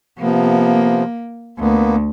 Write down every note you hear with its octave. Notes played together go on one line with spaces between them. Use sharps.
C3 F3 A#3 B3
D2 A#3 B3